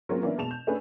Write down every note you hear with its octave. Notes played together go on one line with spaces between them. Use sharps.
F#3 G#3 A#3 C4 C#4 F4
E3 A#3 B3 C#4 D4 E4
B2 G#3 A5 E7 F7
G6
A3 C#4 D4 G#4 A4 B4